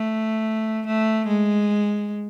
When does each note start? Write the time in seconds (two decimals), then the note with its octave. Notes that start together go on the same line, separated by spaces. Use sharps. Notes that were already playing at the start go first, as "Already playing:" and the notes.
Already playing: A3
0.87 A3
1.27 G#3